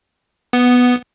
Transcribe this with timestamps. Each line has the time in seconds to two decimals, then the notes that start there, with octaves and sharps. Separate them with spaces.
0.53 B3